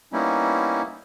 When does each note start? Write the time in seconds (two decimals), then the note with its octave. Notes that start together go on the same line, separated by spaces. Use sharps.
0.13 G3 A#3 B3 C#4 D#4 E4